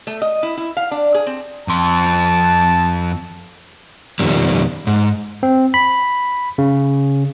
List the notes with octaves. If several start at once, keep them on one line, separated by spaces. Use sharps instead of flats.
A3
D#5
E4
E4
F5
D4
G#4
C4
F2 A5 C6
F2 B2 D#3 G3
G#2
C4
B5
C#3